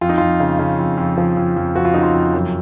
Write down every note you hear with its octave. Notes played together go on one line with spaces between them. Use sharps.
F2 F4
D#4
F2 F4
C#3
C#3
F2
F2
F3
F2
F2
F3 F#4
F4
C#3 D#4
F4
F2
F#2